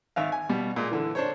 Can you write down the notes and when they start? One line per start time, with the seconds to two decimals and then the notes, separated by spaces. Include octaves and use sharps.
0.16 G#1 E5 F5
0.32 G#5
0.49 B2 G3
0.76 A#2 G#3
0.91 D3 E3
1.15 D4 C5 C#5